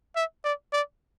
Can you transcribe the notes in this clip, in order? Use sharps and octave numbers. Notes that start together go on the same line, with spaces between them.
E5
D5
D5